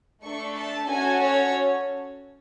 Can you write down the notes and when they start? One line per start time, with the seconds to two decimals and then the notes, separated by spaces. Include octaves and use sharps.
0.23 A3 D4 A4 C#6
0.56 A5
0.89 C#4 F#4 A4 G#5
1.21 C#5